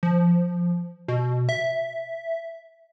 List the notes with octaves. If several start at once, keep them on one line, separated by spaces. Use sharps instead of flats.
F3
B2
E5